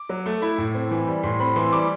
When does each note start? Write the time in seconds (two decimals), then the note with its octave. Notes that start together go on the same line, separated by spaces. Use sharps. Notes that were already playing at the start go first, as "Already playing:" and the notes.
Already playing: D6
0.09 F#3
0.26 A3
0.42 E4
0.58 A2
0.74 C4
0.91 E3
1.07 G3
1.23 A2 C6
1.40 C4 B5
1.56 E3 C6
1.72 G3 D6